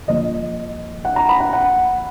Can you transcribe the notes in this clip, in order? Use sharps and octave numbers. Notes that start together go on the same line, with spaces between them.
A#2 F3 D#5
F#5
A#5
B5
F#5
F#5